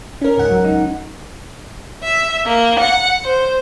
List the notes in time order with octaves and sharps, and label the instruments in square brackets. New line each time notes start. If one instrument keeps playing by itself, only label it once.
[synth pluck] C#4 A#4
C#2 G#2 F#5
F#3
D#4
[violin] E5
A#3
F#5
C5